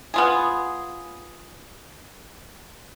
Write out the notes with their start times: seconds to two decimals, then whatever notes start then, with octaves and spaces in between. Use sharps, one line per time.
0.14 B3 F4 G#4